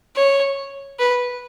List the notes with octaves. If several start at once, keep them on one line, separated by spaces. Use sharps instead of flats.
C#5
B4